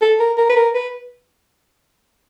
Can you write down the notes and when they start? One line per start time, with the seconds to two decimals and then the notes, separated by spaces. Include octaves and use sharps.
0.01 A4
0.19 A#4
0.37 A#4
0.49 B4
0.56 A#4
0.74 B4